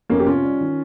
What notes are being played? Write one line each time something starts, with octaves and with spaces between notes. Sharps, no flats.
F2 A#3 C#4
G4
C3 C#4 F4
G3
D#3